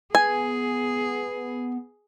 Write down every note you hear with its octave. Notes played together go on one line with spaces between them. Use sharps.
B3 G#4 G#5